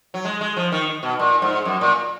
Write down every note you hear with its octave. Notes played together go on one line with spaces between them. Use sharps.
F#3
G#3
G#3
F3
D#3
B2
A#2
G#2
F#2
A#2